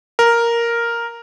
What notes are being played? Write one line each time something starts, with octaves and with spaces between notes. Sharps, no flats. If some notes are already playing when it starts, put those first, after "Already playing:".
A#4